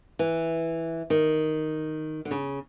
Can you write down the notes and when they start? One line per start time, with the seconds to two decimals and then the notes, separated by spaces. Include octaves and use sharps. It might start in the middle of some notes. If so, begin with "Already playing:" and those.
0.19 E3
1.10 D#3
2.25 D3
2.31 C#3